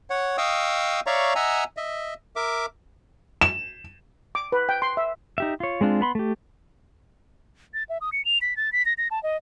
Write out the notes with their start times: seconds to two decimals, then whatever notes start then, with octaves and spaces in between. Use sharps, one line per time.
0.10 C#5 F#5
0.38 D#5 F5 G5 C#6 D#6 E6
1.07 C#5 D5 E5 F5 A#5 C#6
1.35 D#5 E5 F#5 G#5 A#5 E6
1.77 D#5 E5
2.36 A#4 E5 D6
3.41 E7
4.35 D6
4.52 B4
4.69 G5
4.82 C6
4.97 E5
5.38 D#4 G4 E5
5.60 F4 C#5
5.81 G#3 C4 D4 F4
6.01 B3 B5 C6
6.15 A3 G4
7.74 A6
7.89 E5
8.01 D#6
8.13 C#7
8.25 F7
8.42 B6
8.57 A6
8.73 B6
8.86 A#6
8.98 A#6
9.11 A5
9.23 D#5